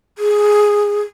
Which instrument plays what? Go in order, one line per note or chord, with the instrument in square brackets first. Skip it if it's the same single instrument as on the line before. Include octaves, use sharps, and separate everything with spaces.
[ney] G#4